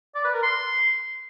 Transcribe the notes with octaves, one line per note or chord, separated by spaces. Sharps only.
D5
B4
A#4
C6